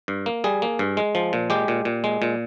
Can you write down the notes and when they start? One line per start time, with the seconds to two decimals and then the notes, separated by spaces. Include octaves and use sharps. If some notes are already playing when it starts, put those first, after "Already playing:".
0.08 G2
0.26 A#3
0.44 G3 G#4
0.62 A#3
0.79 G2
0.97 G#3
1.15 F3
1.33 A#2
1.50 G#3 G4
1.68 A#2
1.85 A#2
2.04 G#3
2.22 A#2